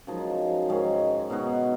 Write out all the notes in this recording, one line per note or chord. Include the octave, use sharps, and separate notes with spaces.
F#2 F3 G#3 D#4
G#2 D#3 G#3 C#4
B2 G#3 D#4 F#4